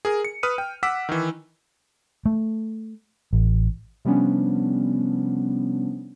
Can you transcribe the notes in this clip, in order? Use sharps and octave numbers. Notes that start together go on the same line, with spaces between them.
G#4 A#4 D#6
C#7
B4 D#6 F6 D#7
G5
F#5 D6 E6 B6
D#3 E3
A3
A1
C3 F3 G3 B3 C#4 D4